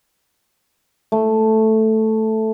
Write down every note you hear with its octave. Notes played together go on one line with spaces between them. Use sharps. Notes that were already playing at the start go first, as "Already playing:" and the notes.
A3